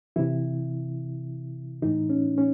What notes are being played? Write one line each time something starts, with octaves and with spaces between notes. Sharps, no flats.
C3 E3 E4
A2 E3 D#4
C#4
C#4